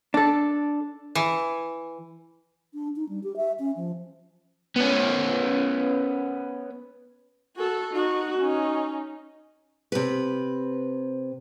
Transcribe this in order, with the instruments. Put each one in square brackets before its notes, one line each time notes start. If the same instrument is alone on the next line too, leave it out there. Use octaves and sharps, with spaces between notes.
[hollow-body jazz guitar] D4 A4
[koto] E3
[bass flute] D4
D#4
G3
G4
E5
C#4
F3
[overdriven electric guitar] B3 C#4
[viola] F#4 A4
D#4 F#4
C#4 D#4
[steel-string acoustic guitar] C3 B4